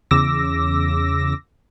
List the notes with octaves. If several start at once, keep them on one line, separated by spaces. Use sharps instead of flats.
E2 C#3 D6 E6 A#6